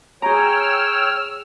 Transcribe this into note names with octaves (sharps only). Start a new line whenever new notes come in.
G#4 C#5 G5 A#5 E6 F6